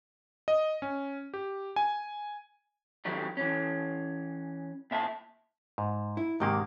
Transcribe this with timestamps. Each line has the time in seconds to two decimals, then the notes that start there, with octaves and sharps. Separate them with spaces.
0.48 D#5
0.82 C#4
1.34 G4
1.76 G#5
3.05 D3 D#3 F#3 G3
3.37 E3 C#4
4.91 A#2 E5 A5
5.78 G#2
6.17 E4
6.40 G#2 C3 D#3 A#3 G4